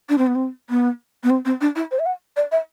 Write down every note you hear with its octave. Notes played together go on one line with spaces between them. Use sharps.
D4
C4
B3
C4
B3
B3
C4
C4
D4
E4
C5
E5
F#5
D5
E5